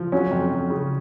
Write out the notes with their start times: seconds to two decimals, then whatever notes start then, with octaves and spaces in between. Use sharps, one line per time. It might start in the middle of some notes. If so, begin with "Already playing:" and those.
Already playing: F3
0.12 F#3 C#4
0.31 F2
0.51 F2
0.70 C#3